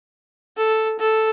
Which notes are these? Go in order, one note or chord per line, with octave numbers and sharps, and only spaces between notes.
A4
A4